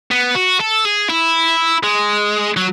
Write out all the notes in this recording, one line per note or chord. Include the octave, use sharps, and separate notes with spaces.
B3
F#4
A4
G#4
E4
G#3
F#3